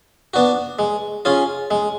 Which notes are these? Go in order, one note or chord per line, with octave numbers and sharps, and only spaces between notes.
B3 D4 F#4
G#3
C#4 F4 G#4
G#3